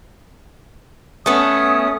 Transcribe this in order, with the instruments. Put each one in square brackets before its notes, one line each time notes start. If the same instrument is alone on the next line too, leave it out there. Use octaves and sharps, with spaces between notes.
[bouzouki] A3 B3 [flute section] C#4 D#6